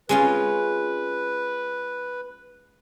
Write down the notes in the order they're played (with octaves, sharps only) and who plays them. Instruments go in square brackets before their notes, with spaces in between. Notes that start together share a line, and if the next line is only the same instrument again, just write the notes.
[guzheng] G#3 C#4 F4 [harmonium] B4